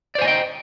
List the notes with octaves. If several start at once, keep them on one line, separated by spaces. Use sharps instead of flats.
C5 D5 D#5 G5 G#5